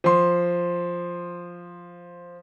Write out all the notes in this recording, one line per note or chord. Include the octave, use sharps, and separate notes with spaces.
F3 C6